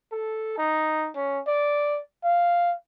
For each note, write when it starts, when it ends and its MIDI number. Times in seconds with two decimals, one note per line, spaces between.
0.12 0.54 69
0.58 1.09 63
1.16 1.40 61
1.47 2.00 74
2.24 2.74 77